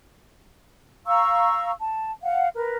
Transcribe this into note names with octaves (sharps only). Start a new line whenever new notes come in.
F5 A#5 C#6 E6
A5
F5 F#5
A#4 B4